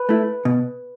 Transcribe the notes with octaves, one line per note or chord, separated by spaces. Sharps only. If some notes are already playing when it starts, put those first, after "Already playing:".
Already playing: B4
A3 E4
B2